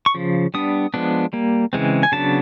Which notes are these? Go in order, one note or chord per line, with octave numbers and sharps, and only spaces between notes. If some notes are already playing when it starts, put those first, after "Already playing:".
C#6
C#3 F3
G3 B3 D4 D#6
F3 G#3 B3 D4
G3 A#3
C#3 E3 G#3 C4
G#5
C#3 F#3 B3 D4 A5